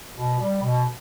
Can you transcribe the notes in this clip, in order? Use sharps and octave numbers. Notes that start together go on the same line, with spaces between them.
B2
G3
B2